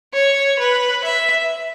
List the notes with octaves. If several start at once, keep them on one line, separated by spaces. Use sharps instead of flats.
C#5
B4
E5